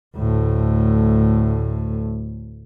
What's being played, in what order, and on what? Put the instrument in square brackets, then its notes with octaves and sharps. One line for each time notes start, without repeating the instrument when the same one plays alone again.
[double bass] D2 A2